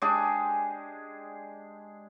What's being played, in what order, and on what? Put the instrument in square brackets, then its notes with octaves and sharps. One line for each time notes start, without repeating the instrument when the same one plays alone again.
[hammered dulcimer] G#3 D4 G4 G#4